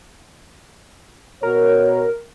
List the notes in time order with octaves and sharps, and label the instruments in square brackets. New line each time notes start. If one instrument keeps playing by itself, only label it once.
[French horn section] B2 F#4 C#5 [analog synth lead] A#4